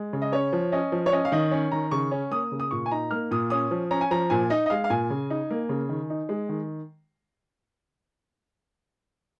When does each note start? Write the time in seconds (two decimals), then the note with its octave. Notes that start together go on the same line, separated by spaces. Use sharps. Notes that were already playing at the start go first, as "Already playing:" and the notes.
Already playing: G#3
0.13 C#3
0.22 D#5
0.32 C#4 C#5
0.53 F3
0.72 C#4 D#5
0.92 F3
1.06 C#5
1.12 C#4 D#5
1.25 F5
1.32 D#3 D#5
1.51 C#4
1.72 D#3 A#5
1.91 C#3 C#6
2.11 C#4
2.31 A#3 D#6
2.52 C#3
2.60 D#6
2.71 A#2 C#6
2.86 G#5
2.91 D#4 A#5
3.11 A#3 F6
3.31 A#2 D#6
3.50 C#4 D#6
3.71 F3
3.91 C#4 A#5
4.01 G#5
4.11 F3 A#5
4.30 A#2 G#5
4.50 D#4 D#5
4.66 D#5
4.70 G#3 F5
4.84 F5
4.90 A#2 G#5
5.10 C#3
5.30 D#4
5.50 A#3
5.69 C#3
5.89 D#3
6.10 D#4
6.29 G#3
6.49 D#3